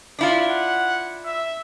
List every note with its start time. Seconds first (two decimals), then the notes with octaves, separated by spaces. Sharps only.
0.19 D4 E4 F4
0.49 F#5
1.25 E5